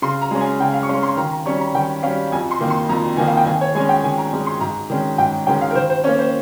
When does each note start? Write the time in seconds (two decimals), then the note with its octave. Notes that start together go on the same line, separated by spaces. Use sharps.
0.02 C#3 C6
0.21 A#5
0.31 G#3 C#4
0.41 G#5
0.60 C#3 G5
0.74 F5
0.83 C#6
0.88 G#3 C#4 C6
1.03 C6
1.17 D#3 A#5
1.32 A#5
1.46 G3 C#4 C#6
1.60 A#5
1.74 D#3 G5
2.03 G3 C#4 F5
2.32 F2 G#5
2.51 C6
2.61 D#3 A#3 D#4
2.70 C6
2.89 F2 A#5
3.17 D#3 A#3 D#4 G#5
3.27 F5
3.37 G5
3.46 D#3 G#5
3.61 C#5
3.75 G#3 G#5
3.80 C#4
3.89 G5
4.03 D#3 G#5
4.18 A#5
4.33 G#3 C#4
4.46 C6
4.61 G#2 A#5
4.90 D#3 G#3 C#4
5.18 G#2 G5
5.47 D#3 G#3 C#4 G5
5.61 F5
5.71 A#4
5.75 D#3 C5
5.90 C5
6.04 C#4 C#5
6.08 A#3
6.19 C5